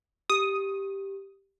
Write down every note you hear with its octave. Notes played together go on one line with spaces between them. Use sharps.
G4 D#6